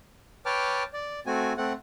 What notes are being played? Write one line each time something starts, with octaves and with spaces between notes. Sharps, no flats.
B4 C#5 G5 A5 D6 F6
D5
A3 C4 F#4 G#5
A3 C4 F#5